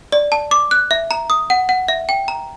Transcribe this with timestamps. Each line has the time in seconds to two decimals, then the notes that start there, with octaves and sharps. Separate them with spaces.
0.12 D5
0.32 A5
0.51 D6
0.71 F#6
0.91 E5
1.11 A#5
1.30 D#6
1.50 F#5
1.69 F#5
1.88 E5
2.09 G5
2.28 A#5